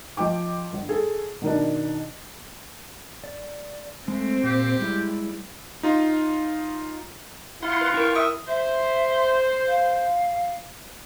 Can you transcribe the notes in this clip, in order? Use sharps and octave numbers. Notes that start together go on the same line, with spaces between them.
F3 D#5 G5 D6
G1
G#4 A4
B2 D#3 D4
D5
G#3 A3 C4
A#2 G4
G3 G#3 E4
D#4 F4
E4 F4 F#5 C6
B4
E4 A#4 G5 C#6
E5 D#6
C5 E5
F5